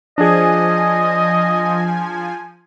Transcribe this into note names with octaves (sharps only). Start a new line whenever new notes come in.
F3 D4 G#4 D#5 G#5